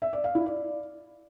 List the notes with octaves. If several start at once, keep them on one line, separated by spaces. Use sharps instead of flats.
E5
D5
F5
E4
D5